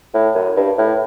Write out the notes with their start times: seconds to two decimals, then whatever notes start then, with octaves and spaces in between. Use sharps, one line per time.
0.14 A2
0.35 F#2
0.56 G2
0.78 A2